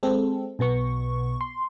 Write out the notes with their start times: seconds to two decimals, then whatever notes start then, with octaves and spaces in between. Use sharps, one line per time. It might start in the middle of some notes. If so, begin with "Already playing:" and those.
0.03 G#3 C4 A4
0.59 B1 B2 B3 C#6
1.41 C6